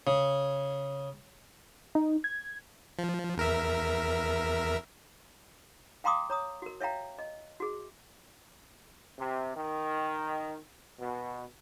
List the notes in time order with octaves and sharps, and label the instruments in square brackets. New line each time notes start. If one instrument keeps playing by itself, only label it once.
[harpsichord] C#3
[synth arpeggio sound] D#4
G#6
[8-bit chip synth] F3
E2 A#4 E5
[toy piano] F5 G5 A#5 C6 D6 D#6
C#5 A#5 D#6
F#4 A#4
C#5 E5 F5 G5 A#5
D#5
F#4 G#4
[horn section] C3
D#3
B2